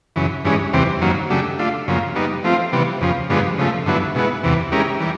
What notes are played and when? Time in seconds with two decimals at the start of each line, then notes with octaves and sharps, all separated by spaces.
0.16 F#2 C#3 E3
0.44 G2 E3 G#3 C#4
0.73 E2 C3 E3 G3 C4
1.01 F#2 D#3 F#3 A#3
1.30 C#3 F#3 A3 D4 G4
1.59 A3 D4 F4
1.88 F#2 C#3 F3 A#3
2.16 G3 B3 D#4
2.44 F3 A3 C4 F4
2.73 C3 E3 G3 B3
3.01 F2 C#3 F3
3.30 G2 D3 F3 G#3 B3
3.58 C#3 F3 A3
3.86 G2 D3 F#3 B3 E4
4.15 B2 G#3 B3 E4
4.44 E2 C3 E3
4.72 G#3 C#4 E4 G4 A#4
5.00 E3 G3